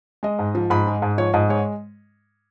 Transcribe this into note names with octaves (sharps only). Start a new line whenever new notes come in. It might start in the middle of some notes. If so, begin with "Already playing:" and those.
G#3 D#5
G#2
F3
G#2 B5
G#3
G#2
F3 C#5
G#2 D#5
G#3 C#5